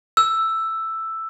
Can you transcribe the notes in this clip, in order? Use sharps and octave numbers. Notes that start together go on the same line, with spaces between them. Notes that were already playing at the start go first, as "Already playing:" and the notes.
E6